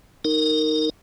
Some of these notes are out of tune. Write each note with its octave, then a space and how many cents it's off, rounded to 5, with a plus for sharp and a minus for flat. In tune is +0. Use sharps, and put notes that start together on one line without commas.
D#4 +0 A#4 -15